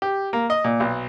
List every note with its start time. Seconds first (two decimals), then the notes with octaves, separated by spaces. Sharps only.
0.02 G4
0.33 A#3
0.50 D#5
0.64 A#2
0.80 B1